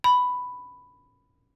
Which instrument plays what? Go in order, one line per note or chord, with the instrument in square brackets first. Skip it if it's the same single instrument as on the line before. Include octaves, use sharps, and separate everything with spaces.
[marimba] B5